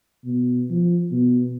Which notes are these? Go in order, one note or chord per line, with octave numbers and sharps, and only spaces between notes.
B2
F3
B2